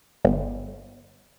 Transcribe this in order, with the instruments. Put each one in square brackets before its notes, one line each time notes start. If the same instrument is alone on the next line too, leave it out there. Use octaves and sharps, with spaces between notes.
[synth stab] G1